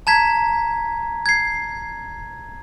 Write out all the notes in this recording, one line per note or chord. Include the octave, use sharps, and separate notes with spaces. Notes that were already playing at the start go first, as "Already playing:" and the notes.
A5 A#5 G#6 B6
G#6 C7